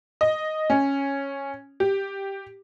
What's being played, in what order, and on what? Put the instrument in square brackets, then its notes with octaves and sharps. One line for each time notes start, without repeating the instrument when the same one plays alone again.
[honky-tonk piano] D#5
C#4
G4